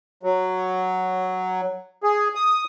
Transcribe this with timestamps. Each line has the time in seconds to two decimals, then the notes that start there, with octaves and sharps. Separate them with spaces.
0.23 F#3
2.03 G#4
2.35 D#6